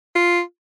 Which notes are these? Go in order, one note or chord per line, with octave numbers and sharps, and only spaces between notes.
F4